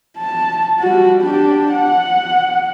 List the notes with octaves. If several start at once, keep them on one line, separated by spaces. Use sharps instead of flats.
A5
G3 F#4
D4 G4
F#5